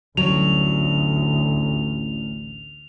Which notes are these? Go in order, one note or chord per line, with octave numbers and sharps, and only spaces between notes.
A1 D2 F#3 F7